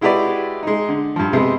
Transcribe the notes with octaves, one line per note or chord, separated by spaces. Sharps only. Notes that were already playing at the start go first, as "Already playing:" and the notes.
G#3 E4 F#4 G4 B4 D5
G#3 D#4
D3
G2 F3
C3 G#3 B3 C4